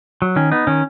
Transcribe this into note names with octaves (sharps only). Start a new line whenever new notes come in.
F#3
D#3 C#4
B3 D#4
D#3 C#4